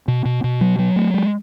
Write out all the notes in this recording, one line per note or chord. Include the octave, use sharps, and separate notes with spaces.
B2
B2
B2
F#3
F#3
A3
G#3